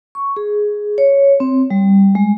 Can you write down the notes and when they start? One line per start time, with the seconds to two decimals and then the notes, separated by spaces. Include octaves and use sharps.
0.15 C#6
0.37 G#4
0.98 C#5
1.40 C4
1.70 G3
2.15 G#3